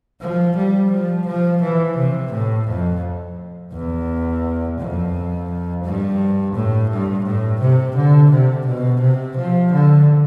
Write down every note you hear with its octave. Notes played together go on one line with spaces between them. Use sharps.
F3
G3
F3
F3
E3
C3
A2
F2
E2
F2
G2
A2
G2
A2
C3
D3
C3
B2
C3
F3
D3